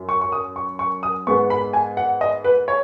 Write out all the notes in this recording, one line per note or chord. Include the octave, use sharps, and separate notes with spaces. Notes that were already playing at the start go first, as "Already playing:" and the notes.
Already playing: F#2 F#3
C#6
C#6
D#6
C#6
C#6
D#6
G#2 G#3 B3 C#6
B5
G#5
F#5
D#5
B4
C#5